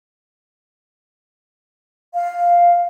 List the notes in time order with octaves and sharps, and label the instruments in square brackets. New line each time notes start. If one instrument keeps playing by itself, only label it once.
[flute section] F5